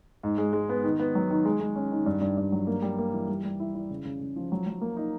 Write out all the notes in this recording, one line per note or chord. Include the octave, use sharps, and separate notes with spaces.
G#2
G#3
G#3
B3
D#3
B3
F#3
D#3
G#3
G#3
C#4
D#3
G2
G2
G2
F#3
A#3
G3
A#3
E3
G3
G3
E4
E4
C#3
C#3
C#3
F3
F#3
F#3
A#3
D#4